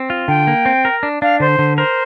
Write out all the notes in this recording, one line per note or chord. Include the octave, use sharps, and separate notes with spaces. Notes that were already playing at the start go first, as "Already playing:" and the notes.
Already playing: C4
F4
D3 G5
A#3
C4
A#4
D4
D4 F5
D3 C5
D3
A#4 C5